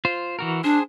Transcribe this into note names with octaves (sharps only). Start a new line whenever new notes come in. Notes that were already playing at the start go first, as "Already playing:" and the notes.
F4 C5
E3 F#4 A#4
D4 G#4 C5